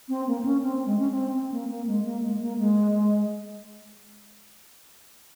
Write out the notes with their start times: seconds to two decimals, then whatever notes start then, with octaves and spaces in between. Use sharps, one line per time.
0.09 C4
0.27 A#3
0.40 C4
0.45 C#4
0.63 C4
0.86 G#3
0.99 C#4
1.10 C4
1.34 C4
1.52 A#3
1.70 A#3
1.87 G#3
2.05 A#3
2.23 G#3
2.41 A#3
2.59 G#3